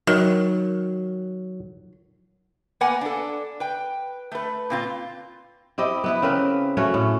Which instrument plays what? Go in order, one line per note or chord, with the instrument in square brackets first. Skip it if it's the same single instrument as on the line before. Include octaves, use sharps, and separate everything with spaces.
[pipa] D#3 [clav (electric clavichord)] F#3
[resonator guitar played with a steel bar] A#3 B3 B4 F#5 G#5
D4 A4
B4 G5
A3 B4
A#2 C4 F4
[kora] C4 E4 G4 D#5
B3 E4 B4
C#3 C4 A#4 B4
A3 C#4 F#4 C#5
A2